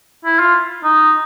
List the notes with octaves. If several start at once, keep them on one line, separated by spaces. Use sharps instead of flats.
E4
F4
D#4